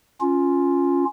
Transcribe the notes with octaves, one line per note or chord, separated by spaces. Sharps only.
C#4 F4